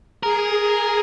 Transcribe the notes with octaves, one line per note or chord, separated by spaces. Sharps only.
G#4 A#4